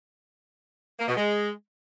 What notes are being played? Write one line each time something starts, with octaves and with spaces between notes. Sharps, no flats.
A#3
B2
G#3